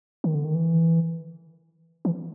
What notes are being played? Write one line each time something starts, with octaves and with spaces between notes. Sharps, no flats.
D#3
D3
D#3
E3
E3